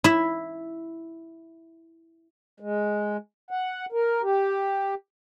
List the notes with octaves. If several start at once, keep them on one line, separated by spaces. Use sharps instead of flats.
E4 E5
G#3
F#5
A#4
G4